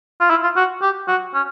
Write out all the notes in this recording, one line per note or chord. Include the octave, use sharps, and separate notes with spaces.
F4
E4
F4
F#4
G4
F#4
C#4